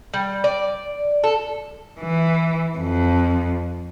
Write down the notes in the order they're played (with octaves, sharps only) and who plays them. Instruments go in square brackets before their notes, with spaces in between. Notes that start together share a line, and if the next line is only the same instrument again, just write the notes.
[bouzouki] G3
D5
A4
[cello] E3
F2